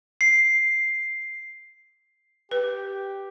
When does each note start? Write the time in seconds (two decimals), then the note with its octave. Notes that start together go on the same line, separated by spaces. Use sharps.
0.21 C7
2.51 G4 B4